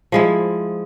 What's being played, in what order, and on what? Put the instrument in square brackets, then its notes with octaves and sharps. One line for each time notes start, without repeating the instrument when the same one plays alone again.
[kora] F3 G#3 E4